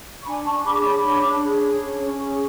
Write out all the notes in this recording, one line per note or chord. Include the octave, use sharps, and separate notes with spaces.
C#6
D4 G#5 B5
D4 A5 C#6
G#4 B5 D6
C#5 B5 D6
D4
D4
G#4
C#5
C#4
C#4
G#4